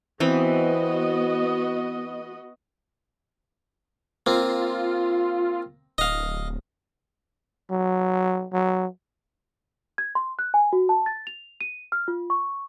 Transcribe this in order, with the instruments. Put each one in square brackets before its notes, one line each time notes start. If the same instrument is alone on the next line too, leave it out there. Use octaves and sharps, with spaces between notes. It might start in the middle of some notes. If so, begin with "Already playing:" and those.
[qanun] E3 C4 B5 [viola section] B3 F#4 D#5
[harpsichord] A#3 C4 [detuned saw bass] F4
[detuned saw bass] D1 [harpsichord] D#5 F5
[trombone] F#3
F#3
[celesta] G#6
C6
F#6
G#5
F#4
A5
A6
F7
D#7
F6
F4
C#6